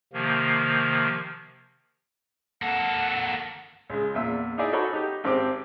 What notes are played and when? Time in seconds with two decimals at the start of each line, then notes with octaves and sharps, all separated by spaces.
0.13 C3 D#3 F3 A#3
2.62 A#3 A4 F#5
3.90 C#2 G#3
4.14 E2 A#2 E5 E6
4.58 D#4 E4 G#4 D5 E5
4.72 D#4 F#4 A4 C#5 B5
4.93 D#4 G4
5.24 G#1 C4 G4 D6